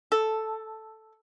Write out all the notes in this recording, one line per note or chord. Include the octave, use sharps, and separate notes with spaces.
A4